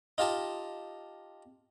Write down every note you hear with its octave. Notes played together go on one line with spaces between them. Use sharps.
D#4 F4 G4 A5